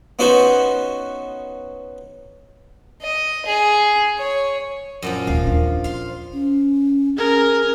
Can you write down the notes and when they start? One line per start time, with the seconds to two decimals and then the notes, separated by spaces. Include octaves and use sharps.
0.19 B3 C#4 D#4 F#4 C5 C#5
3.02 D#5
3.45 G#4
4.17 C#5
5.02 F#2 A#2 F3
5.27 D#1 D#2 F5
5.47 D4
5.84 F5 C6
6.33 C#4
7.17 C#4 G#4 A#4